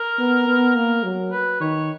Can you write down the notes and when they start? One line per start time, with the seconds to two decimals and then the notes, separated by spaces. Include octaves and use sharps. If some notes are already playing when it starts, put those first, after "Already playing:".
Already playing: A#4
0.19 B3
0.47 B3
0.75 A#3 A#4
1.03 F#3
1.32 B4
1.60 D#3 C#5